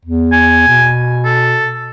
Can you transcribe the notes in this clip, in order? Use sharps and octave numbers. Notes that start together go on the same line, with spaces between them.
E2
G#5
B2
A4